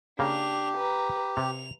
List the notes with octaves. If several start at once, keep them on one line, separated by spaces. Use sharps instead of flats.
C#3 A#3 D4 G4 F7
B4 A#5
C3 F7